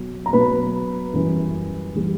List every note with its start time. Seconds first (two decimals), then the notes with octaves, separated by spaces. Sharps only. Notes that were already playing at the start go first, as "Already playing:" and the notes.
Already playing: B2 F#3
0.26 A#5
0.33 B2 F#3 B4 B5
1.13 F#2 E3 G3
1.95 E3 G3